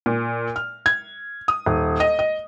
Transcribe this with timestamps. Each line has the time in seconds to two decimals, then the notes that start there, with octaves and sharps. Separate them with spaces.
0.06 A#2
0.56 F6
0.86 G#6
1.48 D#6
1.66 D#1
2.00 D#5
2.19 D#5